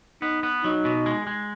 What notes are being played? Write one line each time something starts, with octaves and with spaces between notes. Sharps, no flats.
B3 D#4
B3
F#3 D#4
B2
G#3
G#3